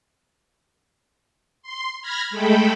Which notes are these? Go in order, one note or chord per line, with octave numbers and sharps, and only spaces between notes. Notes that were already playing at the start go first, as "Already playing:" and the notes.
C6
B5 F6 G#6 A#6
G#3 A3 A4 G5 B5